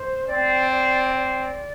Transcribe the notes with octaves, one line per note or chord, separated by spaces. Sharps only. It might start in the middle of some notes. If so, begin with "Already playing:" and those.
Already playing: C5
C4 D5
D5
D5